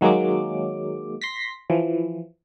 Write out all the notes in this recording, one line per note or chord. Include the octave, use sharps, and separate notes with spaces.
D#3 F#3 G#3 A#3 D6
C6 A#6 B6
E3 F3